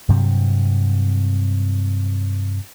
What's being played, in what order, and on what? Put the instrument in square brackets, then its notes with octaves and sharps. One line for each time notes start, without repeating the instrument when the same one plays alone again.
[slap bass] G2 C3 F#3 C4